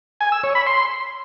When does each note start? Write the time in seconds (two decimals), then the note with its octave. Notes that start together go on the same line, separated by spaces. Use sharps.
0.21 G#5
0.32 E6
0.44 C#5
0.55 B5
0.67 C6